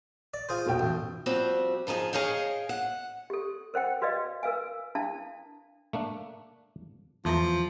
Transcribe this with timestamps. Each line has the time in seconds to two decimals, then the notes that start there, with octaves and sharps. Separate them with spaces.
0.34 D5
0.49 F4 G#4 C5
0.66 F1 B2 G5
0.79 A1
1.26 F3 G3 C4 F#4
1.87 C#3 F3 D#4 G#4
2.13 G#4 C#5 D#5 F5 G5
2.69 F#5
3.30 G4 A4
3.74 A#4 C5 F#5 G5
4.02 F#4 B4 D5 D#5 F5
4.43 A#4 B4 F5 G#5
4.95 D4 E4 F5 A5
5.93 A3 A#3 D4
7.25 E2 F3 A3 A#5